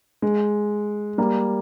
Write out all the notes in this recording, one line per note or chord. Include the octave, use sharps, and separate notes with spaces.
G#3
G3 A#3